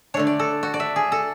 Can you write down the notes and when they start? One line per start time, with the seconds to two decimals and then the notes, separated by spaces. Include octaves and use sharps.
0.14 D4 C#5
0.17 D3 A3
0.27 D5
0.40 A4
0.63 F#4
0.74 D5
0.80 E5
0.96 G#4
1.12 A4